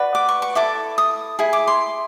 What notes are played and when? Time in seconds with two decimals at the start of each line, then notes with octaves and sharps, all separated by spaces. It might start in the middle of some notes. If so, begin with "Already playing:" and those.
Already playing: F#4 B4 D5
0.15 D6
0.29 C#6
0.42 C#6
0.55 E4 A4 D6
0.98 D#6
1.39 E4 G#4
1.53 D6
1.67 C6